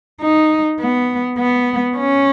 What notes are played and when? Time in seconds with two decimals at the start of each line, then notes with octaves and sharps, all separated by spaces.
0.21 D#4
0.80 B3
1.38 B3
1.97 C#4